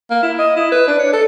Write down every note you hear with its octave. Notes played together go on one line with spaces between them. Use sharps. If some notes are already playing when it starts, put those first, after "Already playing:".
A#3
E4
D#5
E4
B4
D4
C#5
A4